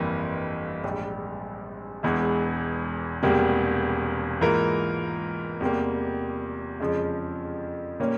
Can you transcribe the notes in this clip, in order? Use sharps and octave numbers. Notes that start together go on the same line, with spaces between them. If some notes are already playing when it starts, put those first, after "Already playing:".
Already playing: G1 F2 E3 G3 A#3
A#1 G#2 G3
E1 E2 E3 G#3
E1 E2 C3 G3 A#3
G#2 E3 A#3 F4 A#4
E2 C3 G3 A#3
F2 C#3 F3 G#3
A#2 G3 A#3 C#4